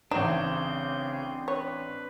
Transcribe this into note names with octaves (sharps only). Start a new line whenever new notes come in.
A1 C#3 C4 D4 D#4 G#4 G6 E7
B4 C#5